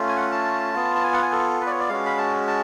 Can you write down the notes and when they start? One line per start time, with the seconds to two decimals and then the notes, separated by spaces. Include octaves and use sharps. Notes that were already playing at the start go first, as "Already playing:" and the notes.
Already playing: A3 C#4 F4
0.08 G#5
0.16 F#5
0.32 A5
0.74 B3 F4
0.95 A5
1.04 G#5
1.13 F#5
1.22 G#5
1.32 A4
1.61 B4
1.67 D5
1.70 C#5
1.80 D5
1.89 G#3 C#4 F#4 F5
2.06 B5
2.18 A5
2.47 A5